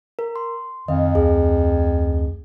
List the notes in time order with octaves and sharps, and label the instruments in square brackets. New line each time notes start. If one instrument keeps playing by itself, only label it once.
[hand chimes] A#4
C6
[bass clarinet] F2 [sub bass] D#3 [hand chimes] D#5 F5
[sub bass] D2 [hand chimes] G#4